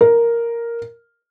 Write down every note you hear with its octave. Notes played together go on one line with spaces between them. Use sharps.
A#4